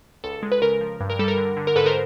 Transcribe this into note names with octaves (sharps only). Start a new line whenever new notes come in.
C#2 A4
G#3
B4
C#3 A#4
F3
G2
A#4
G3 A4
A#4
D3
D3
A#4
G#2 A4 B4
A#4 C5